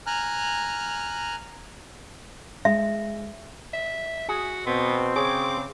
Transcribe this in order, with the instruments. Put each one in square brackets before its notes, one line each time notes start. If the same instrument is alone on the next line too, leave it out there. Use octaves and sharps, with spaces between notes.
[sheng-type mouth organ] G#5 A#5 F6 F#6
[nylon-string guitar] G#3 [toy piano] E5
[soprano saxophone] E5
[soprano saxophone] F#4 [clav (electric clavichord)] G#4
[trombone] B2 [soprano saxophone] B3 [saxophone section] C4
[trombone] C#3 [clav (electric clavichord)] G#4 C#5 [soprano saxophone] D6